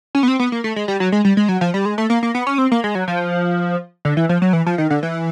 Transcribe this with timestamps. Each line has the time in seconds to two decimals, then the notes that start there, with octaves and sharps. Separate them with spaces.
0.15 C#4
0.23 B3
0.28 C4
0.40 B3
0.52 A#3
0.64 A3
0.76 G#3
0.88 G3
1.00 F#3
1.12 G#3
1.25 G3
1.37 G#3
1.49 F#3
1.61 F3
1.74 G3
1.85 G#3
1.98 A3
2.10 A#3
2.23 A#3
2.35 B3
2.47 C#4
2.58 C4
2.72 A#3
2.84 G#3
2.95 F#3
3.08 F3
4.05 D3
4.17 E3
4.29 F3
4.42 F#3
4.53 E3
4.66 F3
4.78 D#3
4.90 D3
5.03 E3